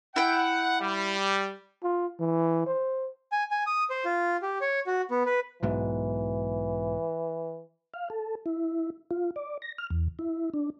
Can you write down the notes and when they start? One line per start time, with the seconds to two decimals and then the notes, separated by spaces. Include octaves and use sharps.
0.16 E4 F#5 G5
0.81 G3
1.83 F4
2.20 E3
2.67 C5
3.32 G#5
3.51 G#5
3.67 D#6
3.90 C5
4.05 F4
4.42 G4
4.61 C#5
4.87 F#4
5.11 B3
5.26 B4
5.63 B1 G#2 B2 E3
7.94 F5
8.10 A4
8.46 E4
9.11 F4
9.36 D5
9.62 A#6
9.78 F6
9.90 E2
10.19 E4
10.54 D4